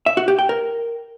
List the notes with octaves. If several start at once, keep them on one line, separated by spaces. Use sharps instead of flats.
E5
F#4
G4
G5
A#4